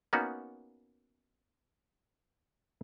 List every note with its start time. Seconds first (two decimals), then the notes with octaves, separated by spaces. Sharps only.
0.13 A#3 B3 C#4 D#4 F#4